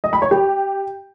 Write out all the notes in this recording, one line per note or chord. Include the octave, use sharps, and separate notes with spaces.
D#5
B5
C#5
G4